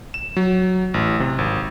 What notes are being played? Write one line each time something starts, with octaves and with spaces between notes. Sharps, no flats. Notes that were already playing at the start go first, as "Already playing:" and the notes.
E7
F#3
A1
C3
G#1